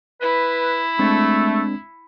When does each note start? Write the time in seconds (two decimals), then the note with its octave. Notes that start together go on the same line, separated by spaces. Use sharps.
0.21 E4 B4
0.99 G#3 A3 C4 D4